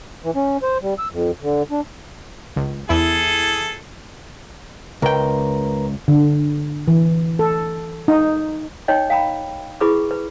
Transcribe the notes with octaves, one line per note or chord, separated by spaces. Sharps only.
E3
C#4
C5
G3
E6
F2
D3
D4
C#2
E2 E4 G#4 A4
C#2 A#4 B4 G5 A#5
D3
E3
A4
D#4
D#4 C#5 D#5 G5
F5 G5 A#5 B5
E4 G#4 B4 B5 C#6 D6
B4